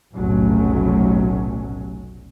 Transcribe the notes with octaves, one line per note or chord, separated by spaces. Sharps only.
F1 B1 A2 F#3 A3 C#4